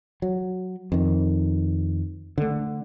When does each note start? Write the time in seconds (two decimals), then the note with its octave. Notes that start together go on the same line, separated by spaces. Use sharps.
0.22 F#3
0.92 F2 D#3
2.38 D3 A3